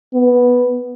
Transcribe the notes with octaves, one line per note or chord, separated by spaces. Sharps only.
B3